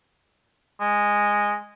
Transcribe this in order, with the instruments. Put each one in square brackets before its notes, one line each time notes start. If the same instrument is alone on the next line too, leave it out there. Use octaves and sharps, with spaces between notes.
[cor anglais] G#3